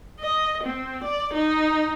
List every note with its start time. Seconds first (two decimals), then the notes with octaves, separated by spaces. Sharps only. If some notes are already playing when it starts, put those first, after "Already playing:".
0.20 D#5
0.63 C4
1.04 D5
1.34 D#4